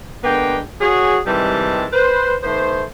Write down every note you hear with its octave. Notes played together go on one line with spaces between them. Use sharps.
D3 G#3 A#3 B3 G5
F#4 G#4 C#5
C3 D#3 E3 G3 G#3 A5
B4 C5
D#3 A3 B3 C5